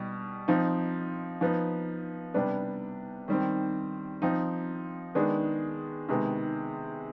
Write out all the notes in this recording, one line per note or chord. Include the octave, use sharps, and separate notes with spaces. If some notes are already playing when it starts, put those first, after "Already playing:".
Already playing: B2 G3
F3 C4 D#4
F3 B3 D#4
C3 G3 B3 D4
D#3 G3 C4
F3 C4 D#4
D#3 G#3 B3 D4
C3 D#3 G#3 B3